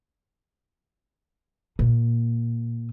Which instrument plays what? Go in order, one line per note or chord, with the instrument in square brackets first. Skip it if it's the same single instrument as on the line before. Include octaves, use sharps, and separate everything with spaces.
[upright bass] A#2